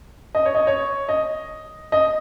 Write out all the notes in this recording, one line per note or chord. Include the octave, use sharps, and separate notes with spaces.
D#5
C#5
D#5
C#5
D#5
D#5